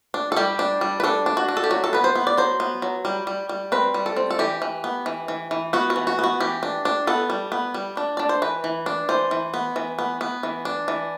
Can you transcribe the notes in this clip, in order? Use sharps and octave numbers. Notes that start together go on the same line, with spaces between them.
D4
A4
G3 G4
D4
G3
B4
D4 A4
D4
F#4
D4
A4
G4
F#3 F#4
A4
B3 B4
C5
B3
D5
F#3 C5
B3
F#3
G3
G3
G3
C4 B4
G3
A4
C4
A4
E3 G4
E3
B3
E3
E3
E3
B3 F#4
F#4
E3
F#4
B3 F#4
E3 G4
D4
D4
B3 A4
G3
B3
G3
D4
D4 D5
C5
E3 B4
E3
D4
E3 C5
E3
B3
E3
B3
B3
E3
D4
E3